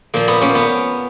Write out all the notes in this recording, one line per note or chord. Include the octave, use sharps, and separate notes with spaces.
A#2 F3 A#3
B3
A#3 C#4
B3